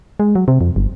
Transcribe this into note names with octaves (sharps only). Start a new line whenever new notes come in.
G#3
F#3
C3
F2
G1